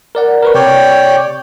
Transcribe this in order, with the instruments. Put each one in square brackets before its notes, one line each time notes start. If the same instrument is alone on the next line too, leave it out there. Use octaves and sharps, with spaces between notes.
[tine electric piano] A#4 D5 F#5
A#4 B4 C#6
[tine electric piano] C3 [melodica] C#5 D5 G5